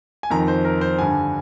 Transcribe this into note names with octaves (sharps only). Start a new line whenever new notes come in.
G#5
F2 D#3 A#5
C5
A#4
C5
G2 D3 G#5